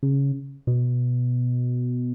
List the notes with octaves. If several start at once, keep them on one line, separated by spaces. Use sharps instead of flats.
C#3
B2